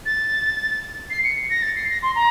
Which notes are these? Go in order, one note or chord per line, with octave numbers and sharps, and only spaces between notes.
A6
C7
C#7
A#6
A6
C7
A#6
C6
A#5